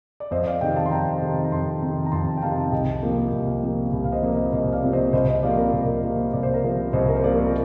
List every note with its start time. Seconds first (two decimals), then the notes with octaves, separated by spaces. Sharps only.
0.20 D5
0.31 F2 C5 D#5
0.46 D5 F5
0.61 C3 D#3 D#5 G5
0.76 F5 A5
0.86 C6
0.91 F2 G5 A#5
1.22 C3 D#3
1.44 A#5
1.52 F2 A5 C6
1.82 C3 D#3
2.06 A#5
2.12 F2 A5 C6
2.37 G5
2.42 C3 D#3 F5 A5
2.72 C2 D#5 G5
3.03 C3 F3 A#3
3.33 C2
3.62 C3 F3 A#3
3.93 C2
4.04 F5
4.12 C5 D#5
4.23 C3 F3 A#3
4.33 C5 D#5
4.52 C2 C5 D#5
4.72 D5 F5
4.83 C3 F3 A#3
4.93 C5 D#5
5.13 C2 C5 D#5
5.29 C5 D#5
5.43 C3 F3 A#3 D5 F5
5.58 A#4
5.73 C2
5.86 A#4
6.03 C3 F3 A#3
6.33 C2 D5
6.43 C5
6.54 A#4
6.64 C3 F3 A#3 C5
6.93 C2 C5 D#5
7.08 A#4
7.16 C5
7.23 C3 F3 A#3 A#4 D5
7.47 A#4